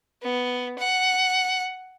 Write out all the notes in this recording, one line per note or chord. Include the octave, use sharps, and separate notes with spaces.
B3
F#5